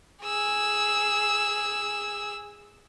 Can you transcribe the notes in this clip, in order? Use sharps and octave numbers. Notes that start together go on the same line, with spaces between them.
G#4 E6